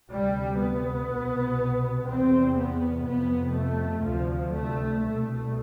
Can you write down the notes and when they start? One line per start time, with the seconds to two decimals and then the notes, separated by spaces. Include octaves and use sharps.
0.11 D2 C3 G3
0.60 B3
1.09 C2 B2
2.07 E2 C3 C4
2.56 B3
3.05 F2 C3 B3
3.54 A3
4.03 D2 C3 F3
4.52 A3
5.01 C2 B2 A3